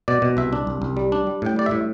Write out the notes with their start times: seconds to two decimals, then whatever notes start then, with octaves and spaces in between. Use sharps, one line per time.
0.08 B2 D5
0.22 B2
0.37 C2 E5
0.53 D4
0.67 C2
0.82 C2
0.97 G3
1.12 D4
1.27 G3
1.42 A2 G5
1.56 G3 D5
1.66 A2 E5